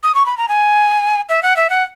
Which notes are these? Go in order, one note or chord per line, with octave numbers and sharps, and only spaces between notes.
D#6
C#6
B5
A#5
G#5
E5
F#5
E5
F#5